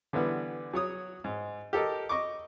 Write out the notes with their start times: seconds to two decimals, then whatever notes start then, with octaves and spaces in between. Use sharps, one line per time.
0.13 D3 E3 G3 B3
0.74 F#3 C#5 D#6
1.24 G#2
1.73 G4 A4 A#4 D#5
2.09 D#5 C#6 D6